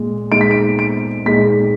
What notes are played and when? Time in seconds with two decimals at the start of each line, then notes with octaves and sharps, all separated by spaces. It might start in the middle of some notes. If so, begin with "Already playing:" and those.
Already playing: A#2 G#3
0.31 A#2 G#3 D#4 D7
0.41 B6
0.51 D7
0.79 D7
1.26 A#2 G#3 D#4 B6